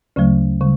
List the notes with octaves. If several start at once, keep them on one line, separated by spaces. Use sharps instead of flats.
D2 C#3 F#3 A3
C#3 G3